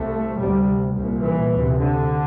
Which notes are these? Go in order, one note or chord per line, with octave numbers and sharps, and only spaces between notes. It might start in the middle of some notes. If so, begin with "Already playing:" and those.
Already playing: C2 C3 A3
D2 C3 G3
C2 A#2
E3
D2 C3
D3